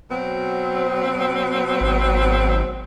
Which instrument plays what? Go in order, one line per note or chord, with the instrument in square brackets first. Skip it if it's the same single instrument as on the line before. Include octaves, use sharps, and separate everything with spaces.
[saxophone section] B2 F#3 C4
[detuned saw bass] G#1